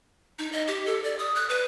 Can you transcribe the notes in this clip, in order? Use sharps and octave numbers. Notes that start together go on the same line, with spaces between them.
D#4
D#5
G4
A4
D5
D#6
F#6
B4